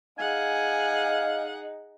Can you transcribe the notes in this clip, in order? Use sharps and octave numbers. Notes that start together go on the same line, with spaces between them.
D#4 G#4 F5 F#5 G#5